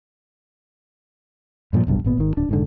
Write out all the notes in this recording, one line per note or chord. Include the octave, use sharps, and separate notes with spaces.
G2 A#2 D3 F3
F1 B1 G2
G#1 A#2 B3
G#1 D#3
D1 D4
F1 G#2 D3